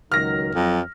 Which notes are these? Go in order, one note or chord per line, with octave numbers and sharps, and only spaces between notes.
C#2 D#3 F#3 F6 A#6
F2 F#3 A4